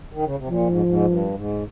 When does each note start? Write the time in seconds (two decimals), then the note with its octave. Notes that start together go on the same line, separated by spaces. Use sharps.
0.13 D#3
0.24 C#3
0.37 C3
0.48 A#2 F3
0.68 G#2
0.86 G#2
1.05 G2
1.34 G#2